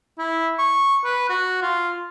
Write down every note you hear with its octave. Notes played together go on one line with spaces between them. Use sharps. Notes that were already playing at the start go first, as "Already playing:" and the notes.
E4
C#6
B4
F#4
F4